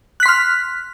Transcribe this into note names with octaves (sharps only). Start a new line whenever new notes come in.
C6 F6 F#6 B6